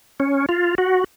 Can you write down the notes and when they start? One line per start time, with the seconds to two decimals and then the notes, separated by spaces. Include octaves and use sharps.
0.20 C#4
0.49 F4
0.78 F#4